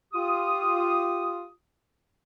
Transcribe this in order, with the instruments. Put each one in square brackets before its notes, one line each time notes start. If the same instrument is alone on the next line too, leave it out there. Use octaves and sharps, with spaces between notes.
[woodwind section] F4 G4 D#6